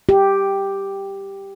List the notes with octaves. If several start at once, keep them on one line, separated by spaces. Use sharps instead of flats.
G4